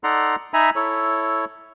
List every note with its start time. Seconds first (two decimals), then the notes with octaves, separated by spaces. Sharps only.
0.04 D#4 A4 D5 F#5 A#5 C6
0.54 D#4 E5 G#5 A#5 B5
0.76 E4 A4 C#5